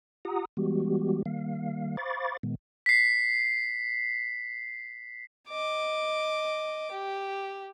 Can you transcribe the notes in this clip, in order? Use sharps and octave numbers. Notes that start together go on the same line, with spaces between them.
F4 G4 F#5 A#5 D#6
E3 G3 G#3 B3 F#4 G4
D#3 G3 A#3 F5
C5 F5 B5 C#6 D6 A6
A#2 D#3 G#3 B3
B6 C7
D#5 D6
G4